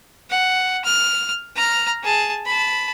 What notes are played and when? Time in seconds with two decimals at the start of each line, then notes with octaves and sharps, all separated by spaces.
0.30 F#5
0.85 F6
1.56 A#5 F6
2.04 G#4 A5
2.46 A5 B5